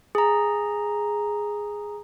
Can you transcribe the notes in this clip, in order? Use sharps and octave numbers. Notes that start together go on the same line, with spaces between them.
G#4 A#5